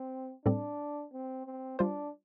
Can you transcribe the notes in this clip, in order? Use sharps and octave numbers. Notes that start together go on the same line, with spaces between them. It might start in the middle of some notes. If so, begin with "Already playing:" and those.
Already playing: C4
A2 G3 C4 D4 A4 D5
C4
C4
G3 D4 F4 C5